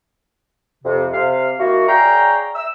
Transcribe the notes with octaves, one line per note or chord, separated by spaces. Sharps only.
F2 C3
C3 F5
D#3 A#3 E4 F#4
G#4 C#5 D5 F5 G5 A#5
E6